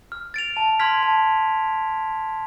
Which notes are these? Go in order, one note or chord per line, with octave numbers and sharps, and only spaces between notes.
F6
A6 D7 F7
A5
C6 F6 G#6 B6
A5